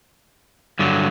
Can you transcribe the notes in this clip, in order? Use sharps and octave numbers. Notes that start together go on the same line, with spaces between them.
G2 D3 F#3